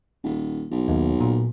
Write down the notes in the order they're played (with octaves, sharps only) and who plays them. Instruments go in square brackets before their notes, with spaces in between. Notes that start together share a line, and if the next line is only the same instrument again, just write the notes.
[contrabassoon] D#1
B1
[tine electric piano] D#2
A#2